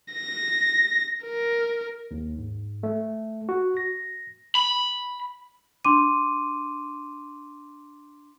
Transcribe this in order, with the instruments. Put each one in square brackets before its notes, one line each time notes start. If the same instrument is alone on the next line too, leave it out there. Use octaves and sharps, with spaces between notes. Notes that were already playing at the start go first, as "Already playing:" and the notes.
[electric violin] A#6
A#4
[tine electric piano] D#2
G#2
A3
F#4
A#6
[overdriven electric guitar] B5
[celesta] D4 C6 D6 D#7